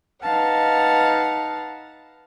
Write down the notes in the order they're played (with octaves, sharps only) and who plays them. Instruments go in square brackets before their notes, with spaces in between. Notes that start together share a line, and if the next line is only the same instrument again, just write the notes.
[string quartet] D#4 B4 F5 F#5 A5